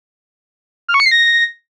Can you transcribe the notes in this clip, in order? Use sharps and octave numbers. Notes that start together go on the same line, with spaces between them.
F6
C#6
C#7
C7
A#6